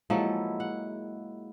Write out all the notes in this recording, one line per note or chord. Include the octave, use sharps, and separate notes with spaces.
F3 F#3 G#3 A#3 E4 A4
F#5